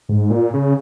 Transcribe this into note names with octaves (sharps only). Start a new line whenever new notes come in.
G#2
A#2
C#3